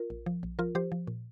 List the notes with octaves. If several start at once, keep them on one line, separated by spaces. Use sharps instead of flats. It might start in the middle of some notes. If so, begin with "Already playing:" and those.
Already playing: F4 A#4
A#1
F3
A#1
F3 F4 A#4
F3 G4 C5
F3
A#2